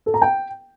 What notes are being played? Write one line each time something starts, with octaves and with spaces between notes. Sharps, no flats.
A4
A#5
G5